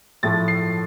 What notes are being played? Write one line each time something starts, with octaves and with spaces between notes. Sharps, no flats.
A2 F3 A3 A6
C7